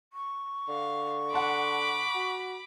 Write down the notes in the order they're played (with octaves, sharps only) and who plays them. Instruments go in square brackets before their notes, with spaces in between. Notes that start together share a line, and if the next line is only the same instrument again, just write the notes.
[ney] C#6
[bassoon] D3 [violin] F5
[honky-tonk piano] F#5 A5 C6 [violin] B5 D6
[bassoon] F#4